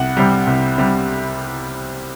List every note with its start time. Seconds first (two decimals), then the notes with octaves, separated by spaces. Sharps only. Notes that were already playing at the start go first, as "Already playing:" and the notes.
Already playing: C2 F#5
0.17 C3 G3
0.47 C2
0.78 C3 G3